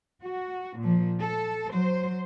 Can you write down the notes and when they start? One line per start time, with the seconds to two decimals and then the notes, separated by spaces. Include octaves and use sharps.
0.22 F#4
0.79 A#2 F3
1.21 A4
1.71 F#3 C5